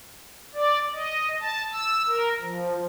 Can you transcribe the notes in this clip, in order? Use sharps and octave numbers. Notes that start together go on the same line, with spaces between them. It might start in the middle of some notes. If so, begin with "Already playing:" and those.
D5
D#5
A5
E6
A#4
F3